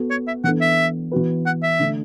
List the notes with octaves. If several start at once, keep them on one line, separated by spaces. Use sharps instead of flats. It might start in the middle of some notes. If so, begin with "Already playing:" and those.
Already playing: B3 F#4 A4
C#5
E5
E3 B3 D4 A4 F#5
E5
E3 B3 F#4 B4
F#5
E5
D3 A3 D4